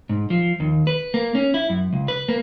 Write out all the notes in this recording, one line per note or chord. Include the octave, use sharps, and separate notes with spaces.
G#2
F3
D#2
B4
A#3
C#4
E4
F#2
C#2
B4
A#3